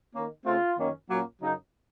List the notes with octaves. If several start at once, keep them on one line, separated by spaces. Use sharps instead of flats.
D#3 A#3 C#4
C#3 A3 C4 F4
F#2 D#3 A#3 C#4
A#2 F#3 A#3 C#4
F#2 C#3 F#3 D#4